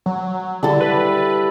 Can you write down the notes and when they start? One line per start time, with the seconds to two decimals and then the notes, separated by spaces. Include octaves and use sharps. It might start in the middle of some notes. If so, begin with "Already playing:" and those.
0.06 F#3
0.63 D3 G3 E4 A4
0.81 B4